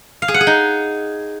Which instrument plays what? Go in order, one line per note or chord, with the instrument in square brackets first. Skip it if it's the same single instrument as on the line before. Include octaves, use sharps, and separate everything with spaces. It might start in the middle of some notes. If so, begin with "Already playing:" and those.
[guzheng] F5
G#4
F#5
G#4
D#4